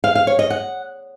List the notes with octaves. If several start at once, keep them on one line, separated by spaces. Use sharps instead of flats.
F5
F5
C#5
D#5
F#5